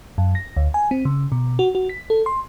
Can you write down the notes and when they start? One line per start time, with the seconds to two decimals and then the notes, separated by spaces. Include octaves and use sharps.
0.18 F#2
0.35 A#6
0.57 D2
0.74 G#5
0.91 C4
1.05 C#3
1.32 B2
1.59 F#4
1.75 F#4
1.89 B6
2.10 A4
2.26 C6